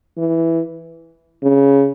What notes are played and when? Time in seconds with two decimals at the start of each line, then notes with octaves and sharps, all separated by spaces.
0.18 E3
1.43 C#3